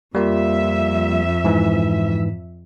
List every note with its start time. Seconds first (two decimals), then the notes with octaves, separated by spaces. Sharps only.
0.15 F2 G3 A#3 F4 E5
1.44 G#2 E3